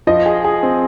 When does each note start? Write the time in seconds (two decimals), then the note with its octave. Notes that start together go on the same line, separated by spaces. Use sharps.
0.07 F3 D#5
0.26 G#4
0.44 G#4
0.63 C4